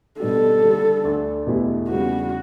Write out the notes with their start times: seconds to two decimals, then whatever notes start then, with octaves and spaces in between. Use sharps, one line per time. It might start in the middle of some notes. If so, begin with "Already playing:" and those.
0.20 B2 G3 D4 G4 A4
0.62 D3 G3 D4
1.04 D2 D3 A3 D4
1.46 E2 B2 A3 E4 G4
1.88 E2 C#3 G3 F#4